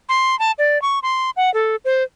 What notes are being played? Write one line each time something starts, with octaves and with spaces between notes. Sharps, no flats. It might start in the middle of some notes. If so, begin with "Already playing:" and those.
C6
A5
D5
C#6
C6
F#5
A4
C5